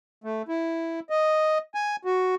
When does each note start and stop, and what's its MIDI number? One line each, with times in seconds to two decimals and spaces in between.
0.24 0.42 57
0.48 1.00 64
1.10 1.58 75
1.74 1.96 80
2.05 2.35 66